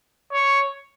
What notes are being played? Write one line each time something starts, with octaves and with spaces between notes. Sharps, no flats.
C#5